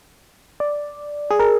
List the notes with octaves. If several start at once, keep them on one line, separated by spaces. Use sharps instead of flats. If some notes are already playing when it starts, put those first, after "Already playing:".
D5
G#4
A#4